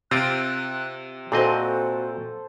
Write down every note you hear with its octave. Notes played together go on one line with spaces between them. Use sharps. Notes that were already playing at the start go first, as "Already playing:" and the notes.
C3 C4 F4 F#6 D7
A#2 C4 F#4 A4 C5 D#5